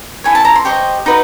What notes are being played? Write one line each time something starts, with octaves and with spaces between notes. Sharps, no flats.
E4 A4 C#5 G#5
A5
A#5
C6
G4 C5 D#5 C#6
D#4 F#4 B4 D#5